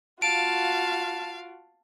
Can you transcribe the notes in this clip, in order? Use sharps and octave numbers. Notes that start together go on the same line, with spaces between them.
F4 F#4 F5 A5 D7